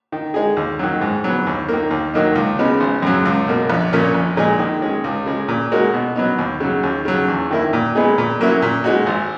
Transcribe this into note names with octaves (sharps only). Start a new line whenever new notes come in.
D#3
G#3 D#4 G#4
D#2
D#3 F#3
G#2
F#3 B3
D#2
D#3 A#3
D#2
D#3 F#3 A#3 D#4
C#2
C#3 G#3 B3 D#4
G#1
F#2 C#3 F#3
C#2
B2 A#3
A#1
A#2 A#3 C#4
A#1
A#2 G#3 D#4 G#4
D#3
G#3 C#4
C#2
C#3 G#3
A#2
G#3 D#4 F#4 A#4
B2
F#3 B3 D#4
D#2
C#3 F#3
D#2
C#3 F#3
E2
D#3 A#3 E4
A#2
G#3 B3 D#4 G#4
A#2
F#3 A#3 C#4 E4
A#2
G#3 D#4 F#4
G#1